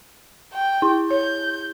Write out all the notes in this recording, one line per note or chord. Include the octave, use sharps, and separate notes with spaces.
G5
E4
C#5 G6